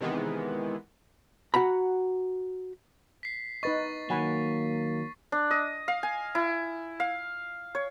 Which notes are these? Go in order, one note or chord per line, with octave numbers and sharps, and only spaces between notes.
C3 D#3 E3 G#3 B3
F#4 F#5 A#5 B5
B6 C7
D#4 B4 D#5 C#6 A6
D#3 F#3 A#3 F#5 G#5 B5
D4
D#5
F5
G#5
E4
F5
C#5